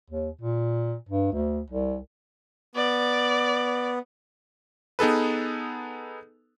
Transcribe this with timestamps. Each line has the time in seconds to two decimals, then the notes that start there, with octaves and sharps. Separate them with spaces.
0.10 D#2
0.41 A#2
1.09 G2
1.33 D2
1.70 C2
2.75 B3 D5
4.99 B3 D#4 G#4 A4 B4